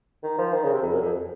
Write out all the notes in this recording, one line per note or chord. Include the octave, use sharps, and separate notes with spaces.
D#3
F3
D#3
C#3
C3
F2
F#2
F2